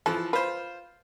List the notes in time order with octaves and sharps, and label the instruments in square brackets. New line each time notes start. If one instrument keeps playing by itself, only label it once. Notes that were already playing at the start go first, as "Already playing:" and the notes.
[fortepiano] E3 F3 [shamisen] A4
[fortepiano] F4 C5 [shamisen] B4